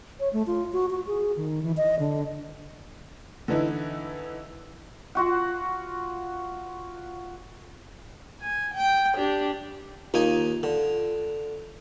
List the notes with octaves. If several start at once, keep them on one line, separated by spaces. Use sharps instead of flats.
C#5
A3
F4
F#4
F#4
G#4
D#3
E3
D#5
D3
D3 E3 D#4 E4
F4 F#4 F#5
G#5
G5
D4 G4
D#2 D#4 F4 G#5
D3